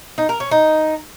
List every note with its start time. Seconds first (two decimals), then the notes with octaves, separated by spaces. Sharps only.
0.18 D#4
0.29 A#4
0.40 C#4
0.51 D#4